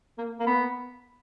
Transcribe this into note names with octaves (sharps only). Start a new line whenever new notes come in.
A#3
A#3
B3